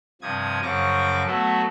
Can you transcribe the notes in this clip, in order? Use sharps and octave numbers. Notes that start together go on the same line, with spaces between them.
G2 C3 F3 D#6 G#6
F#2 C#3 F3 C#6 D6 A#6
F#3 A3 B3 F#4 A4